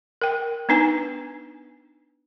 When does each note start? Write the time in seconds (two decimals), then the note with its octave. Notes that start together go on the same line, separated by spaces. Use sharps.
0.21 A#4 G5
0.69 B3 D4 D#4 B4 G#5 A#5